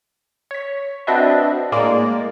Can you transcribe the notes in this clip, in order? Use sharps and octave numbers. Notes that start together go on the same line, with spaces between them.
C#5 B6
C4 D4 F#4 B4 D#5 E5
A2 G#3 A#3 D5